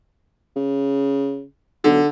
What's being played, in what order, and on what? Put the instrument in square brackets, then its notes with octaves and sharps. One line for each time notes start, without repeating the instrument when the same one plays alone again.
[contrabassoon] C#3
[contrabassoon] B1 [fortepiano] D3